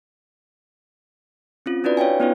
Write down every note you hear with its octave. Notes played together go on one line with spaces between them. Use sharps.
C4 C#4 F4
D4 E4 F#4 B4 D5
C#5 F5 G5 G#5
B3 C#4 D#4 F4 B4 C#5